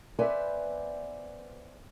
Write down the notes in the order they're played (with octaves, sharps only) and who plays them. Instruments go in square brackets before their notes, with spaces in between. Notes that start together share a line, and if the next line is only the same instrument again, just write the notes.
[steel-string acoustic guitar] B3 B4 C5 D5 E5 G#5